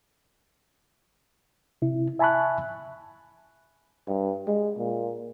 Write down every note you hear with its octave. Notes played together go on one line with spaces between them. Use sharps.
C3 E4
E5 G#5 A5 B5 C#6 F#6
G2
G#3
A#2